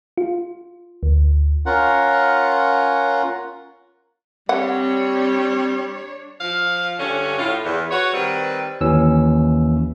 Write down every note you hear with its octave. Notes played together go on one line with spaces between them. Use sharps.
F4
D2
C#4 F4 A#4 F#5
G3 C4 D4 C#5 F#5
F3 F5
G2 D3 C#4
A2 F4
E2
F#4 B4 C#5
D#3 G3 C4 B4
G1 D#2 E3 C#4 E6